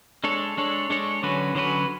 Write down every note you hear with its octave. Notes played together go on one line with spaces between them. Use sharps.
G#3 D4 A4 C#5
G#3 D4 A4 C#5
G#3 D4 A4 C#5
D3 F#3 C#4 F#4 B4
D3 F#3 C#4 F#4 B4